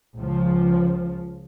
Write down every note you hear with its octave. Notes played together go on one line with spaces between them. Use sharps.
C#2 F3